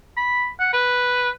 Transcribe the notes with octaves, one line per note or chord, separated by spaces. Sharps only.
B5
F#5
B4